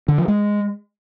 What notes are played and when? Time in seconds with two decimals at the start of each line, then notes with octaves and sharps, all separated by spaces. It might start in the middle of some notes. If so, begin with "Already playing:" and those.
0.08 D3
0.18 F3
0.28 G#3